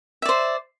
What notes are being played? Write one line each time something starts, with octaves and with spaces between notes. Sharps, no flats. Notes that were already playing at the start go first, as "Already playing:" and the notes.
C5 D5 E5